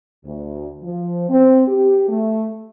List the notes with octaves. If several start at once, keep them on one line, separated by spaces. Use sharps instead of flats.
D2
F3
C4
G4
A3